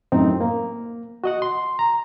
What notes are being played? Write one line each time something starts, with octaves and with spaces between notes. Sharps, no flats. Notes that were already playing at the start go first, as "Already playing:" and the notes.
F#2 A2 C4 D#4
A#3
F#4 D#5 F#5
C6
A#5